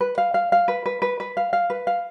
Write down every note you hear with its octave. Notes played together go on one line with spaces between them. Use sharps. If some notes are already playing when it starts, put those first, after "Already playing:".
B4
F5
F5
F5
B4
B4
B4
B4
F5
F5
B4
F5